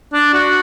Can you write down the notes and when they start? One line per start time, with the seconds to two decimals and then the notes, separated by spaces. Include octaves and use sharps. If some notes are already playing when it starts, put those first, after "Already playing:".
0.13 D4
0.33 F#4